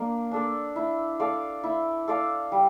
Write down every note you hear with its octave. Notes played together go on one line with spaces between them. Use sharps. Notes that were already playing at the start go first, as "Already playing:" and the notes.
Already playing: A#3 D4 D5
D4 A4 D5
E4
A4 D5 F5
E4
A4 D5 F5
G3